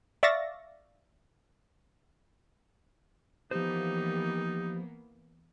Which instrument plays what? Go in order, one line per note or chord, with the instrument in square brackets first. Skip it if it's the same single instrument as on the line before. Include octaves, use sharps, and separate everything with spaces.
[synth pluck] D5 E5 F5 C#6 A6 A#6
[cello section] E3 A#3 B3 [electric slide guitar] F3 C5 [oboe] D#4 [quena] G4